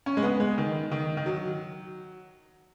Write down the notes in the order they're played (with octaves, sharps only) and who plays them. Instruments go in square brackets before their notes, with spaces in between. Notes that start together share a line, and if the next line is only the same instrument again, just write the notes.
[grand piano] C#4
G#3
B3
G#3
D#3
D#3
D#3
F#3